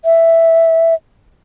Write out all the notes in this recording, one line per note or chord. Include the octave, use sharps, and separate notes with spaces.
E5